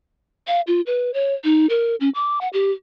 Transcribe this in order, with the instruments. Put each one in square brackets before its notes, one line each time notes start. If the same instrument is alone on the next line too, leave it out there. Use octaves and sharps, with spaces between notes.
[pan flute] F5
F4
B4
C#5
D#4
A#4
C#4
D6
F#5
G4